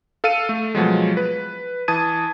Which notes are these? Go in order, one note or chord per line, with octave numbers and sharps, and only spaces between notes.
A4 F5 E6 C#7 D#7
A3
B2 F3 F#3 G#3
B4
E3 A5 D#6 G#6 D#7